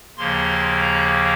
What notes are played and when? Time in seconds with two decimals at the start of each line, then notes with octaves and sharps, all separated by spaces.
0.17 D#2 C#3 F3 A#3 C6
0.82 A#5